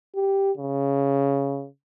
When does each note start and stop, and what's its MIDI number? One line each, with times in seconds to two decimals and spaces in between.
0.16 0.52 67
0.57 1.67 49